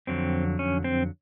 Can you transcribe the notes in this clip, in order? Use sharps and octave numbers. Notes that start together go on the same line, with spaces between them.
F2 D3 F#3 C4
C#4
C4